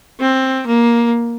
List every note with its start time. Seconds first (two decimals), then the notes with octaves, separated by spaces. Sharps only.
0.20 C4
0.67 A#3